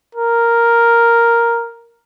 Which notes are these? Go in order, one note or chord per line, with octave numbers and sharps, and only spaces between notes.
A#4